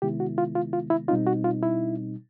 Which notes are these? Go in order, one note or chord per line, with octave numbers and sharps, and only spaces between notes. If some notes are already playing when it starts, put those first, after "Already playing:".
C3 D#3 G#3 B3 E4 G4
F#4
F4
F4
F4
E4
B2 G3 C4 D#4 F4
F#4
F4
E4